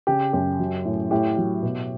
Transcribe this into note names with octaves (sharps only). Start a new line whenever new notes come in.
C#3 G4
F#2 G4
F#3
A2
A2 G4
F#3
B2